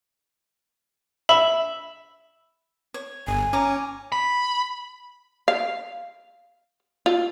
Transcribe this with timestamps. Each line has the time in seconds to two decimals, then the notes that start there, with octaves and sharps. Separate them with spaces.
1.29 E5 B5
2.94 C#5
3.27 G1 G#5
3.53 C#4 A#5 D6
4.12 B5
5.48 F5
7.06 F4